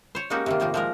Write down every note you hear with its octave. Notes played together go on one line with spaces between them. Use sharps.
C5 C#5
G#3 A#3 C#4 D#4 F#4 G4
C3 D#3 A#3
A2 D#3 F3 A#3
F3 G#3 A#4